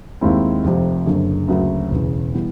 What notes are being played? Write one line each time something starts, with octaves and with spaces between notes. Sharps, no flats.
D#2 D#3 G#3 C4 E4
F1 F2 C3
F#1 F#2 D3
D2 C#3 F#3 A#3
E1 E2 C#3
E3 G3 B3